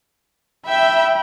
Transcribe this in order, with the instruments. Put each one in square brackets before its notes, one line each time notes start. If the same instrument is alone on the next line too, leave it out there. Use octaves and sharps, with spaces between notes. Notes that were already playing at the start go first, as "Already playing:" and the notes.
[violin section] E5 [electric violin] G5 B5